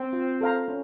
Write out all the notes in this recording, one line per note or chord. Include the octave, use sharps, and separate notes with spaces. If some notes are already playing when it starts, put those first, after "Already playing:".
Already playing: C4
F4
A4 C5 F5 A#5
C#4